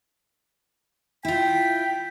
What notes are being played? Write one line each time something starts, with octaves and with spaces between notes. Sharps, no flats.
E4 F4 G5 B6